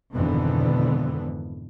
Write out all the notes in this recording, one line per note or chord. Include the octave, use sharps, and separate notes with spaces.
G#1 F2 B2 D3 E3 B3